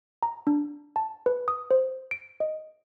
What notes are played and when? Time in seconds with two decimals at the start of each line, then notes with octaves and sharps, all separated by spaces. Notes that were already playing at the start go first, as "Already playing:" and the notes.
0.23 A#5
0.47 D4
0.96 A5
1.26 B4
1.48 D#6
1.71 C5
2.11 D7
2.40 D#5